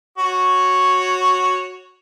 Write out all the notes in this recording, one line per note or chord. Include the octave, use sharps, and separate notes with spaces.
F#4 C#5